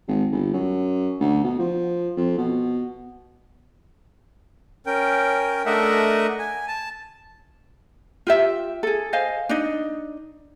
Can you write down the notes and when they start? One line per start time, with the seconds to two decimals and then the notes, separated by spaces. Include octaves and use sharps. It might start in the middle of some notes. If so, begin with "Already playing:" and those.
0.08 G#1
0.32 G1
0.53 F#2
1.20 D2
1.44 B2
1.59 F3
2.17 F2
2.38 B2
4.86 C#4 A#4 G5
5.66 A3 D4 A#4 D#5 E5 F#5
6.39 G#5
6.68 A5
8.27 F4 G4 E5
8.83 G#4 A4
9.13 C5 D#5 F5 G#5
9.49 D4 D#4 D#5